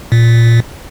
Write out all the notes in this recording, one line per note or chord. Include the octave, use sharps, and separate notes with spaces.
A#2